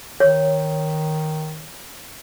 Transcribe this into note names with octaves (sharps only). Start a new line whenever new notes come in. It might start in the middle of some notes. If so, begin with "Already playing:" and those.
D#3 C#5